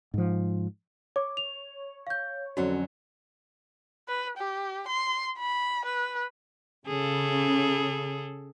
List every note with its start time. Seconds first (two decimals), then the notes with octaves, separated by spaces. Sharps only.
0.14 G#2 F3
1.16 C#5 D6
1.37 F7
2.07 F5 G6
2.57 F2 D3 F#3 C#4 F#4
4.08 B4
4.37 G4
4.88 C6
5.38 B5
5.85 B4
6.87 C#3 G#4 A4